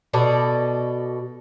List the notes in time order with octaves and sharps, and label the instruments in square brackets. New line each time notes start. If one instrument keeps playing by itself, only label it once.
[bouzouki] B2 A4 D5